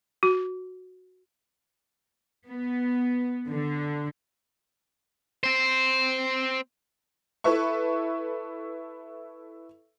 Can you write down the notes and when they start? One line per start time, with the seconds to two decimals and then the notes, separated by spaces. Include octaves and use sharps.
0.23 F#4
2.46 B3
3.49 D3
5.44 C4 C5
7.44 E4 A4 B4 E5 C#6